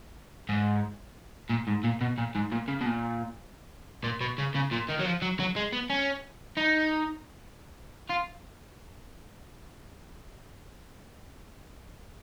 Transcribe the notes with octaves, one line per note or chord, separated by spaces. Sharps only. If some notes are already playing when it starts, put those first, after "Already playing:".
G#2
A#2
G#2
A#2
B2
A#2
G#2
A#2
C#3
B2
A#2
A#2
B2
C#3
C#3
A#2
D#3
F#3
F3
F#3
F#3
G#3
B3
C#4
D#4
F4